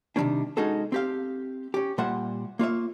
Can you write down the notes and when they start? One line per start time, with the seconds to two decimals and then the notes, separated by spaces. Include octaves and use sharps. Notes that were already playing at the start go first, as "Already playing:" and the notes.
0.16 C3 D#3 F#3 G3 C#4 D4
0.57 G#3 C#4 D#4 F#4 G#4 A4
0.92 C4 G4 F5
1.74 C#4 G4
1.98 A#2 G3 C5 E5 F#5
2.59 A#3 F4 C#5 E5